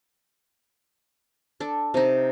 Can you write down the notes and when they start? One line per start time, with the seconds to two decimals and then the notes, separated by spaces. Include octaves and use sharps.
1.60 D4 A4
1.94 C3 D#4